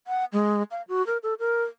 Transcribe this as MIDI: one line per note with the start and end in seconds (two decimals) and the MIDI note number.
0.07 0.25 78
0.33 0.63 56
0.71 0.82 77
0.88 1.05 66
1.07 1.18 70
1.23 1.34 69
1.39 1.64 70